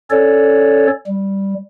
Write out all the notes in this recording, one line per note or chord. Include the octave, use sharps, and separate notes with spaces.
C#4 A4 C#5 D5
G3